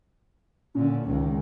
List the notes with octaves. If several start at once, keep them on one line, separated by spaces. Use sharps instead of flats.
A#2 D3 C#4
C#2 D#3